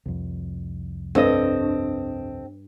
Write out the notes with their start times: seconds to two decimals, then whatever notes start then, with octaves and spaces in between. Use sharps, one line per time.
0.06 C2 F2
1.15 G2 C4 A4 D#5